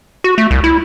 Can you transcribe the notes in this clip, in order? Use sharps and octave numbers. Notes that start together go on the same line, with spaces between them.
F#4
A3
C2
E4